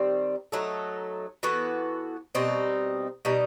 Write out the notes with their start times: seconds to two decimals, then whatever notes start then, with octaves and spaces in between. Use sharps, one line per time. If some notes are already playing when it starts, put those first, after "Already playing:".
Already playing: D#3 G3 C4
0.52 F#3 A3 D#4 A4
1.43 E3 B3 F#4 A4
2.35 B2 G3 C4 D#4
3.25 B2 G3 D#4